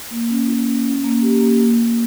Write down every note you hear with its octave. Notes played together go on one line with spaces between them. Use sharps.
A#3
C#4
E4
C#4
C#4
A#3
G4
A#3
A#3
A#3